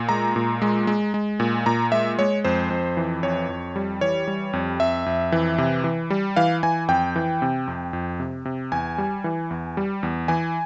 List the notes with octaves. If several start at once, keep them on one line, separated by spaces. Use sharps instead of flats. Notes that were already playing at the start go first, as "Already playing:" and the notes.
Already playing: A#2
G#3 A#5
A#2
G#3
G#3
G#3
A#2
A#2 A#5
G#3 E5
G#3 C#5
F2 C5
F2
E3
F2 C#5
F2
G3
E3 C#5
G3
F2
F2 E5
F2
E3
C3
E3
G3
E3 F5
E3 G#5
F2 G5
E3
C3
F2
F2
C3
C3
E2 G#5
G3
E3
E2
G3
E2
E3 G#5